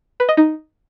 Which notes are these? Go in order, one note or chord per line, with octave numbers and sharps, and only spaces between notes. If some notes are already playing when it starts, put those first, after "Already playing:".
B4
D#5
D#4